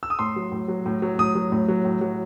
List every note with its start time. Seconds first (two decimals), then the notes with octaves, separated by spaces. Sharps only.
0.03 E6
0.10 D#6
0.19 A2 C6
0.36 F#3
0.52 A2
0.68 F#3
0.86 A2
1.02 F#3
1.19 A2 D#6
1.35 F#3
1.52 A2
1.68 F#3
1.85 A2
2.01 F#3